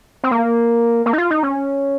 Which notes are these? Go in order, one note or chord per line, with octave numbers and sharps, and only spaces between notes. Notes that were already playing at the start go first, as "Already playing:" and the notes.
C4
A#3
A#3
D#4
F4
D#4
C#4